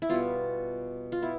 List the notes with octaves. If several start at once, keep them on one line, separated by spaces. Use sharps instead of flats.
E4
B2 G3 B3 F4
F4
B3 E4